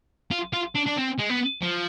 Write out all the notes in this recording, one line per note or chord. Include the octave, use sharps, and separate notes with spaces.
F4
F4
D4
D4
C4
G#3
B3
F3